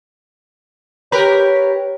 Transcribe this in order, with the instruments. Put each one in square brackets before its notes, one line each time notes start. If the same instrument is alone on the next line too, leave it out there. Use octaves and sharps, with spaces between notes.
[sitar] G4 A#4 B4 [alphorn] C#5